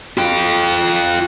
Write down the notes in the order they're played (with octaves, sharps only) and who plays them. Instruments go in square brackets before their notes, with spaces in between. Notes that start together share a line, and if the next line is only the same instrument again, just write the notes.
[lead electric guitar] F4 G5